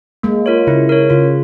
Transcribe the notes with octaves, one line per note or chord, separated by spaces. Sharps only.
G#3 A#3
F4 A#4 C#5
C#3 E4
A#4 C#5
C#3 F4